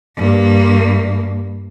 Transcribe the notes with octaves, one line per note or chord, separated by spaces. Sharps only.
G2 A#3